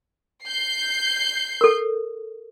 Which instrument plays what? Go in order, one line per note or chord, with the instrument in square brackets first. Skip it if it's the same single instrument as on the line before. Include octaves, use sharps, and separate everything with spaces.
[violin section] G6 C7
[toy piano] A4 A#4